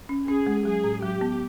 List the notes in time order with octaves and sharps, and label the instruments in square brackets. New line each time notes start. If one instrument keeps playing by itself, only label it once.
[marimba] C#4
[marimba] C#4 [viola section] G#4
[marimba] G#3
[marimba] F#3 [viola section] G#4
[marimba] A2
[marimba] F#3 [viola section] G4
[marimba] B3